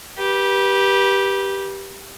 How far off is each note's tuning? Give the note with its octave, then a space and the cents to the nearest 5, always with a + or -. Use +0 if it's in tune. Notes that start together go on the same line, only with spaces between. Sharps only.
G4 +0 B4 -30